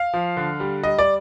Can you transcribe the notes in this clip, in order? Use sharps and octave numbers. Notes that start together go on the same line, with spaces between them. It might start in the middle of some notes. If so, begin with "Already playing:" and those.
Already playing: F5
F3
D3
G3
G3 D#5
D5